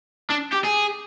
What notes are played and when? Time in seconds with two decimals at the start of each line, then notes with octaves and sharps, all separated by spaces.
0.30 D4
0.53 G4
0.65 G#4